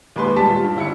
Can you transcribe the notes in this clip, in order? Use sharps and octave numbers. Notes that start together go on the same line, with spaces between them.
D#2 G#3 B4 C6
D#1 G3 G#3 A5 B6
F4
G2
G1 E4 F4 C#7